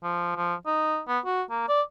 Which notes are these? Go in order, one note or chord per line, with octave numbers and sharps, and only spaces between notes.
F3
F3
D#4
B3
F#4
A#3
D5